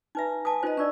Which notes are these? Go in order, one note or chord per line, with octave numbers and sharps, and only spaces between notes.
D#4 B4 E5 G#5 A#5
B4 G#5 A5 D#6
D#4 F4 B4 C5 D#5
D4 D5 C#6 E6